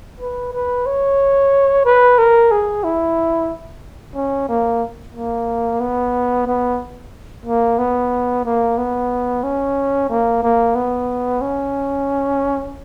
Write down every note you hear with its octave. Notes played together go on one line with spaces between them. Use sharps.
B4
B4
C#5
B4
A#4
G#4
E4
C#4
A#3
A#3
B3
B3
A#3
B3
A#3
B3
C#4
A#3
A#3
B3
C#4